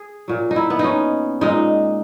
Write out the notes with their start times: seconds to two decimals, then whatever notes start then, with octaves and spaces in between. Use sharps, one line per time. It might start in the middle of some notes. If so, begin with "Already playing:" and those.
Already playing: G#4
0.28 A#2 F#3
0.51 D#4
0.56 E4
0.70 B3
0.79 D#4
0.84 C#4
1.41 A#2 G#3 D#4